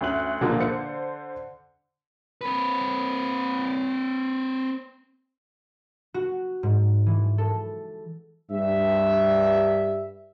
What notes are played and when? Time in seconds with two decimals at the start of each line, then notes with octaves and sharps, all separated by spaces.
0.01 D2 C#4 F#6 F#7
0.41 A#2 D3 F3 A#3
0.60 D3 C5 C#7
2.41 C4 B4
6.14 F#4
6.63 G#2
7.06 E3
7.38 A4
8.51 G2 E5